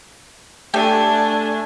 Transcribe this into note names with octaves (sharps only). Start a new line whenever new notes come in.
A3 D4 G4 E5 G5 G#5